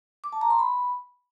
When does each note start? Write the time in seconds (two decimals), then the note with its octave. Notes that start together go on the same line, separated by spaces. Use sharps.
0.24 D6
0.33 A5
0.41 A#5
0.50 C6
0.59 B5